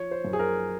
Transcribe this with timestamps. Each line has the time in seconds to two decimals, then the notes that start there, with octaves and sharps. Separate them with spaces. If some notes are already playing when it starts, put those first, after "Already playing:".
Already playing: F3 C#5
0.11 C5
0.24 F#2
0.33 G#4
0.39 A#4